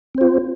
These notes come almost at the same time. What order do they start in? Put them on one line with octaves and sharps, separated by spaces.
C4 C5 F4